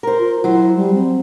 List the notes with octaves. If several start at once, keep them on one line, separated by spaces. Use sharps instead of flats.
A#4 C5
F4
F#3 E4 C5
G3
C4